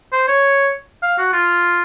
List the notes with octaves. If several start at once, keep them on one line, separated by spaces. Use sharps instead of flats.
C5
C#5
F5
F#4
F4